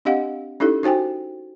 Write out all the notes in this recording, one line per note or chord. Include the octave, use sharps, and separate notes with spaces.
C4 D4 G4 D#5 F5 F#5
C#4 D#4 E4 G4 A4
D#4 F#4 C5 G5 G#5